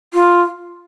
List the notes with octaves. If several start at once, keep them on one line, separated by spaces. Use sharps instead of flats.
F4